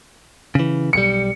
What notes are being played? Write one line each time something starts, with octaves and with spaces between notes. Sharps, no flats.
C#3 E3
B1 G3 C#7